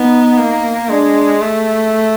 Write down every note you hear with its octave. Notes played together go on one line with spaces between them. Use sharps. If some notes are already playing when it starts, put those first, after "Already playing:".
Already playing: B3 D#4
A#3
G#3 D4
A3